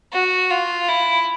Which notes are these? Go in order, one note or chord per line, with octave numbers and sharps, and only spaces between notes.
F#4
F4
E4